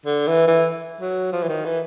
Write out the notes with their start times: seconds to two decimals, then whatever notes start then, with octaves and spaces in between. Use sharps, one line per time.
0.06 D3
0.27 E3
0.47 E3
1.01 F#3
1.32 F3
1.43 E3
1.48 D#3
1.65 E3